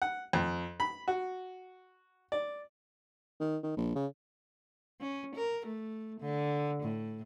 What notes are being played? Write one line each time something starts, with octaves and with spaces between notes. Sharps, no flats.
F#5
F2
B5
F#4
D5
D#3
D#3
A#1
C#3
C#4
A#4
A3
D3
A2